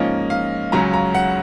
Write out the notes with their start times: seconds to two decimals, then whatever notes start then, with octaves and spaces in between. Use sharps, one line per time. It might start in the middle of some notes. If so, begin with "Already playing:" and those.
Already playing: G#2 F3 A#3 C#4 D#5
0.30 F5
0.72 C#2 C#3 F#3 C#4 A#5
0.93 A#5
1.15 F#5